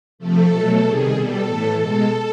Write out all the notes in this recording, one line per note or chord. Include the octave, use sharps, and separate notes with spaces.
C3 F3 A3 A4
B2 F#3 A3
C3 D#3 G3 G#4
B2 G3 A4
A2 E3 A3
B2 G#3 A4